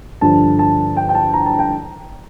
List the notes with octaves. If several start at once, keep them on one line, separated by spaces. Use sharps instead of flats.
G2 D3 F3 A5
A5
G5
G5
A5
A#5
A5
G5